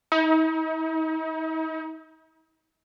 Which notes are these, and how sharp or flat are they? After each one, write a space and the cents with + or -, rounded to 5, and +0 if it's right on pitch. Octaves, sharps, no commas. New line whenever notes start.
D#4 +45